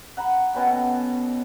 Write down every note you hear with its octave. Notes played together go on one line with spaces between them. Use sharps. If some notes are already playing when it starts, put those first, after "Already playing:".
F#5 A#5 B5
B2 B3 C#4 G5
F#4 A4